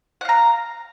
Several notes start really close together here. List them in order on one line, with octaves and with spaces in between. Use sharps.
F#5 F5 A#5